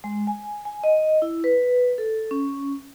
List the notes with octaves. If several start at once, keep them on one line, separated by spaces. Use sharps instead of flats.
G#3
G#5
G#5
D#5
E4
B4
A4
C#4